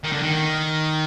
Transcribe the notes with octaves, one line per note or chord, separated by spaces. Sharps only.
D#3
D3
D#3